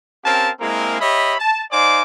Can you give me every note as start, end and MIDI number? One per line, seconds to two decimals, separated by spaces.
0.24 0.50 60
0.24 0.50 61
0.24 0.50 67
0.24 0.50 70
0.24 0.50 77
0.24 0.50 81
0.60 1.00 56
0.60 1.00 58
0.60 1.00 60
0.60 1.00 64
0.60 1.00 68
0.60 1.00 70
1.01 1.35 67
1.01 1.35 73
1.01 1.35 75
1.01 1.35 76
1.01 1.35 83
1.39 1.64 81
1.71 2.02 63
1.71 2.02 72
1.71 2.02 74
1.71 2.02 77
1.71 2.02 80
1.71 2.02 86